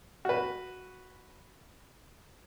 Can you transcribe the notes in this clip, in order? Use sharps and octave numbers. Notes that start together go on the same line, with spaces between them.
F#4 B4